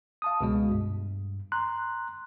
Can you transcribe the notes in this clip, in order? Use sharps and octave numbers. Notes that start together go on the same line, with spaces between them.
F5 A5 D#6
C#2 B2 G#3
G2
A#5 C6 F#6